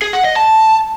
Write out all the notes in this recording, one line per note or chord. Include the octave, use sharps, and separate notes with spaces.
G#4
F#5
D#5
A5